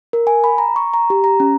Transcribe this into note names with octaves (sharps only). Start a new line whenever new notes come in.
A#4
G#5
B5
A#5
C#6
A#5
G4
A#5
C#4